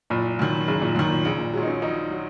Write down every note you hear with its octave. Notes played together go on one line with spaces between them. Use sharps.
F#1 A#2
F#2 D#3
F#1 C#3
A#2
F#2 D#3
A#2
A#1 C#3
A#2
A#2 F#3 G#3
D#4
C#4
A#1 D#4
F#3